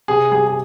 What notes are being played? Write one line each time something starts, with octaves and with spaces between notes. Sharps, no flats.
C3 G#4
G3 G#4
G#4